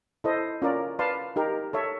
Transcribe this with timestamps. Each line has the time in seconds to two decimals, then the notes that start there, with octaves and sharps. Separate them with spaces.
0.24 E4 A4 C5 D#5
0.62 C#4 F4 A#4 D5
0.99 B4 D5 F5 A5 C6
1.36 D#4 G4 A#4
1.73 A4 C#5 E5